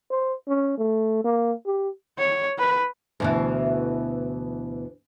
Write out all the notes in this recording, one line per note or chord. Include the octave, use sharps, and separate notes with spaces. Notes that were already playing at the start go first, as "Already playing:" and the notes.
C5
C#4
A3
A#3
G4
C#5
B4
D2 B2 E3